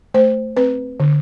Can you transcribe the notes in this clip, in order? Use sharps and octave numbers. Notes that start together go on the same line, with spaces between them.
A3 C5
C4 B4
D3